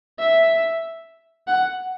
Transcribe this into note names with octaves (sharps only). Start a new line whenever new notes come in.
E5
F#5